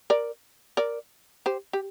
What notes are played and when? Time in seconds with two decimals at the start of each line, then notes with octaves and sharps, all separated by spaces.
0.10 A#4 D5
0.77 A#4 D5
1.46 G4 C5
1.73 G4